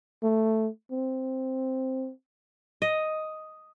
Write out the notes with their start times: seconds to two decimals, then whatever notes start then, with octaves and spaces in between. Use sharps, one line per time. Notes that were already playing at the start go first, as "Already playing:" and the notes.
0.23 A3
0.91 C4
2.82 D#5